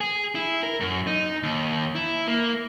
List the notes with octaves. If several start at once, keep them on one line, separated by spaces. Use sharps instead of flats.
G#4
E4
A#4
F#2
D#4
D#2
E4
A#3